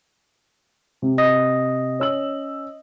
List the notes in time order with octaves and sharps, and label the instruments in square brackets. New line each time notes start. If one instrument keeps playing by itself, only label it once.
[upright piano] C3
[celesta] D#5 D#6 A#6
[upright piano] C#4 E6 F#7